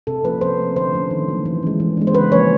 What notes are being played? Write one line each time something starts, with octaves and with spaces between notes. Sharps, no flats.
C3 A4
F3 A#3 C#4 B4
F3 C5
A3 C4
D3 C5
F3 A3 C#4
D#3
F#3 A#3
E3
G#3 C#4
E3
G#3 B3 D4
C5
C#3 B4
F3 A#3 C#4 C#5